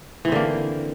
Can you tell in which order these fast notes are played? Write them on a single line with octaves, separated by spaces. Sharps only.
E3 C4 D3 A#3